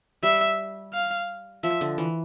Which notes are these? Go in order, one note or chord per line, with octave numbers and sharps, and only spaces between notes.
G3 E5
F5
F3 E5
D3
E3